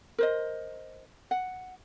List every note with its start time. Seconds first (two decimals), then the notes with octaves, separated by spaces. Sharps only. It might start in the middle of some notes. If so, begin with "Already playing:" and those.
0.18 A#4 C5 D#5
1.31 F#5